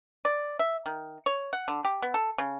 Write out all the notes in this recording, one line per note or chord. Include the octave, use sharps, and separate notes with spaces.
D5
E5
D#3
C#5
F#5
D3
G4
B3
A4
C#3